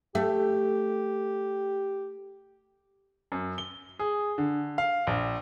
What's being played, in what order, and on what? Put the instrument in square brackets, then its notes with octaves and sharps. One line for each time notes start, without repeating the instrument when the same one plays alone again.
[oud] A3 [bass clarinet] G4
[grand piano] F#2
G7
G#4
D3
F5
A#1